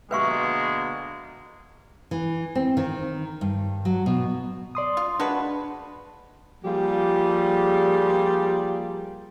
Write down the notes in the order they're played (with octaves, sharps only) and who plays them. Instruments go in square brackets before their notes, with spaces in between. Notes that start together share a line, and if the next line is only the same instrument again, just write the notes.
[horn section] B2 D3 A#3 [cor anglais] G#3 [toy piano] B4 E5 C#6
[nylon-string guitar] E3
C4
D#3
G2
F#3
B2
[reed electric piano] D5 C6 D#6
[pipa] F4
[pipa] G#3 F#4 B4 [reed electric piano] D4 A5
[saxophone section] F3 G3 A#3 F4 G4 G#4